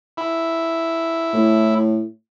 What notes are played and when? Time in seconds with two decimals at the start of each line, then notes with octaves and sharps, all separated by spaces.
0.17 E4
1.33 A2